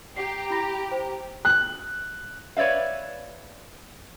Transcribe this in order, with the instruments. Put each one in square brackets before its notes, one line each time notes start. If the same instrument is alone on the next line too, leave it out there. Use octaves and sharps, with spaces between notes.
[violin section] G4 A#5 [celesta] C7
[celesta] E4 B5 A#6
C5
[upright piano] F#6
[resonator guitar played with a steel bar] B4 C#5 D5 E5 F5